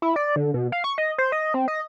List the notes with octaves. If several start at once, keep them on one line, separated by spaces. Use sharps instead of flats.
E4
D5
D3
B2
F5
C#6
D#5
C5
D#5
C4
D#5